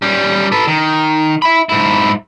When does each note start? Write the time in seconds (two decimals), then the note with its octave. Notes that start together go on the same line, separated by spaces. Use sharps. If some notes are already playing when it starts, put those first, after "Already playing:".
0.02 G3 C#4
0.52 A4 B4
0.67 D#3
1.42 E5 B5
1.69 G#2 E4